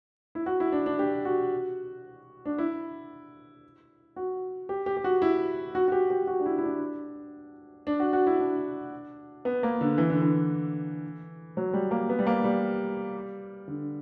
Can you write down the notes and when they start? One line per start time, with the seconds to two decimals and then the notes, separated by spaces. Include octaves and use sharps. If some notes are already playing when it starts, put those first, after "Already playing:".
0.35 E4
0.46 F#4
0.60 E4
0.72 D4
0.86 D4
0.99 G4
1.25 F#4
2.46 D4
2.58 E4
4.16 F#4
4.69 G4
4.86 G4
4.97 G4
5.04 F#4
5.22 E4
5.75 F#4
5.88 F#4
5.92 G4
6.10 G4
6.27 F#4
6.40 D4
6.46 E4
6.58 E4
6.64 D4
7.87 D4
8.00 F#4
8.13 F#4
8.27 E4
8.39 D4
9.45 B3
9.63 A#3
9.81 D3
9.98 E3
10.10 D3
10.22 E3
11.57 F#3
11.73 G3
11.91 A#3
12.09 B3
12.19 G3
12.27 A#3
12.44 G3
13.68 D3